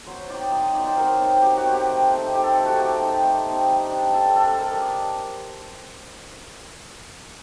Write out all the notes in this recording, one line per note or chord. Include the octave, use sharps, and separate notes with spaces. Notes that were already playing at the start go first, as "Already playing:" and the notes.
F#3 C5
C4 D#4 D5
F#3 D#5
D#5
C4 D#4 D5
C5
F#3 A#4
C4 D#4
F#3 G4
F#4
C4 D#4
G4
A3
C4 D#4
A3 G4
A4
C4 D#4
F#4
A3 G4
C4 D#4
A3
C4 D#4
G3
D4
G3 A4
D4 A4
G3 A#4
D#5
D4 D5